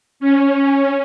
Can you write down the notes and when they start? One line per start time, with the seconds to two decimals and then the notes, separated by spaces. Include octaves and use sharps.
0.20 C#4